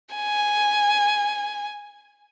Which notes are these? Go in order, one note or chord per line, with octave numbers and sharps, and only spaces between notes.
G#5